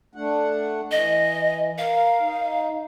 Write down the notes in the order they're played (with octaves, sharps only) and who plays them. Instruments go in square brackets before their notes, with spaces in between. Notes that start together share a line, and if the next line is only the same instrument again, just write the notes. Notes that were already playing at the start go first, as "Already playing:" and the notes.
[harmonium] A3 D4 F#5
[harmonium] E3 [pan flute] D#5
[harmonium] A#4 [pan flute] F5
[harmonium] D#4